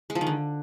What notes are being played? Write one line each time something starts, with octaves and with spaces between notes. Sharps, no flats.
G#3
F3
D#3
D3